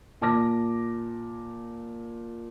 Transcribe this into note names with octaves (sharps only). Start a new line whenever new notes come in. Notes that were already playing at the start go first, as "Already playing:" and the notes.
A#2 A5 D6 A#6